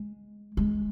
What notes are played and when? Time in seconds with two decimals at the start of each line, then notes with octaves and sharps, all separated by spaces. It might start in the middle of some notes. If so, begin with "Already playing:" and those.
Already playing: G#3
0.57 G#3